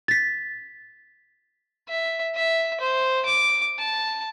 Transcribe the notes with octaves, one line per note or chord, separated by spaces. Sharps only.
A6 B6
E5
E5
C5
D6
A5